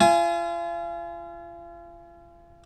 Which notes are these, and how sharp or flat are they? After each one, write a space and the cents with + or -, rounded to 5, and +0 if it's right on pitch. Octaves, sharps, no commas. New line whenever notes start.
F4 -35 G#5 +0